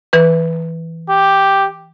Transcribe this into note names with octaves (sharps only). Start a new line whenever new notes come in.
E3 B4
G4